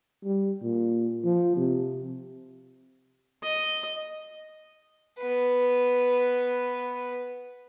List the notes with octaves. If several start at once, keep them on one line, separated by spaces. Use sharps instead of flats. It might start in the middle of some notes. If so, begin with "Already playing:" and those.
G3
A#2
F3
C3
D#5
B3 B4